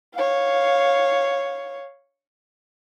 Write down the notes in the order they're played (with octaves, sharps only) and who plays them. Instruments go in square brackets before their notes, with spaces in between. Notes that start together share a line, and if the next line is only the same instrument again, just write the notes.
[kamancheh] C#5 F5